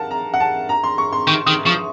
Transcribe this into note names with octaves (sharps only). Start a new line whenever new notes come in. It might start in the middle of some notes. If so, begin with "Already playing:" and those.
Already playing: A#4 F5 F#5 A5
A#5
F#5
A5
A#5
C6
C#6
C6
D#3 C#6
D#3 D#6
F3 C#6